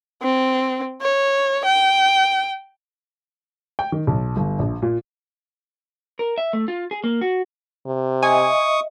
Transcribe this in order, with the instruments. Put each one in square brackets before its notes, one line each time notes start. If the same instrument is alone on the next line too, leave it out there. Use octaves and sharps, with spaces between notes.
[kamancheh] C4
C#5
G5
[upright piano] G5
D#3
B1
G1
A#1
A#2
[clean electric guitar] A#4
E5
A3
F4
G#4
A#3
F#4
[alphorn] C3
[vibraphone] D#5 E5 [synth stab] G#5 [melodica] C#6 D#6